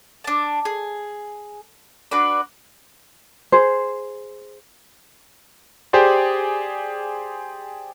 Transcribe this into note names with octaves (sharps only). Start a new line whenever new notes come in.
D4 A5
G#4
D4 F#4 B4 D5
G#4 C5
G4 G#4 C5 D5